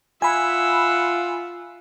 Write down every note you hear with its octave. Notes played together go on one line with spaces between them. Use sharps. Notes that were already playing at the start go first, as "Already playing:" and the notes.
F4 E5 F#5 G#5 B5